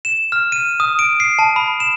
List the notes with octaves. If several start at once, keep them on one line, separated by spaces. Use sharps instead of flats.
E7
F6
D#7
D#6
D7
C7
A5
B5
E7